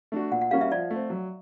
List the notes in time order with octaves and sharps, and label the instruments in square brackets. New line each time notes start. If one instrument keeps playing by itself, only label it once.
[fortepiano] A3 D4 F#4
[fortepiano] A#2 [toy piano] F#5
[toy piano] F#5
[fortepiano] G3 A#3 C#4 F#4 [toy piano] F5
[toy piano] E5
[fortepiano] F3 [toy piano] D5
[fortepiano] A3
C4
F#3